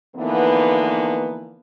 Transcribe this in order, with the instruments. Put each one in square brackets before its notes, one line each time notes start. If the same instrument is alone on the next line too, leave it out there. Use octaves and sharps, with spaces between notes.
[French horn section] D3 E3 F3 A#3 B3 D#4